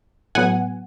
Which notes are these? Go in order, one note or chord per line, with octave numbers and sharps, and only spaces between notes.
A2 F#3 B3 F#5 G#5